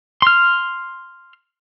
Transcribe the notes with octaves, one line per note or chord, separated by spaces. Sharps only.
C6 F6